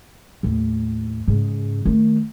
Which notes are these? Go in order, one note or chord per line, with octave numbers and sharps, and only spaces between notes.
D#2 A2
G#2 C#3
D#3 A3